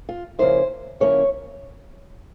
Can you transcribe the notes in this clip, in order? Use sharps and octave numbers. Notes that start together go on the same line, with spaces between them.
F4
C#3 F3 A#3 C#4 E4 C5
C#3 F3 A#3 C#4 E4 C#5